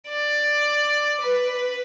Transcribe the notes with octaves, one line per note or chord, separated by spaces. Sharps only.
D5
B4